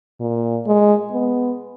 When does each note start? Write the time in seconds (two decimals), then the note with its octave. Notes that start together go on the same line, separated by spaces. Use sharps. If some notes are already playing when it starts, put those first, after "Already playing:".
0.21 A#2
0.67 G#3
1.12 B3